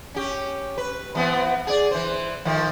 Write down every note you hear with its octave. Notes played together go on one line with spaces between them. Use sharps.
C#4 G4
B4
E3 B3 C4
G#4 D5
E3 C5
D#3 F3 A3